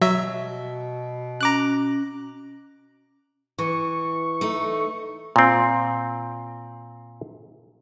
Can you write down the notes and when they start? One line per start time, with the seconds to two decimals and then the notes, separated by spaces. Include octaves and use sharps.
0.02 B2 F#3 E5
1.41 C#4 A#5 D6 F#6
3.58 E3 C#6
4.41 A3 D#4
5.36 A#2 C4